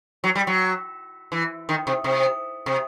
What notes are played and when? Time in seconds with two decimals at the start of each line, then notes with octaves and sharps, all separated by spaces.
0.24 F#3
0.35 G3
0.47 F#3
1.32 E3
1.69 D#3
1.87 C3
2.04 C3
2.66 C3